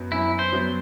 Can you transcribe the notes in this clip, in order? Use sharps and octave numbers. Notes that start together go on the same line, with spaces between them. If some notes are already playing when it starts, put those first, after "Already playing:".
Already playing: F#2 F#3 B3
F#2 E4
C5
F#3 B3